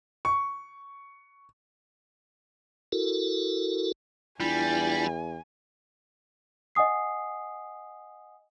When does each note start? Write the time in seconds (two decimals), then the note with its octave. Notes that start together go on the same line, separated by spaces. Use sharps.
0.25 C#6
2.92 E4 F#4 A4 A#4
4.40 E2 G3 D4 E4 F4 G#5
6.75 D#5 F#5 G#5 D#6 C7